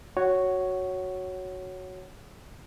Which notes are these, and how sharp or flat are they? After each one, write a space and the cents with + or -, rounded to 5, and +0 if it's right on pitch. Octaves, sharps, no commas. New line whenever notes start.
F#4 +0 C#5 +0 F#5 +20